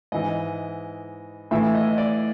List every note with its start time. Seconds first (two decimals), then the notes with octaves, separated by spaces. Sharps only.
0.12 G#2 E3 D#5
1.51 A2 E3 E5
1.75 D#5
1.98 D5